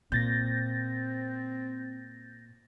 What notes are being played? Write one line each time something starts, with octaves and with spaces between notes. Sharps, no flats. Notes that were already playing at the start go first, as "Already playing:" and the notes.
A#2 C4 G6 A6 A#6